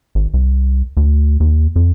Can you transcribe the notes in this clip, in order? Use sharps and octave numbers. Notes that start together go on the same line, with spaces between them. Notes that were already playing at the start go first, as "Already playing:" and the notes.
G#1
C2
D2
D#2
F2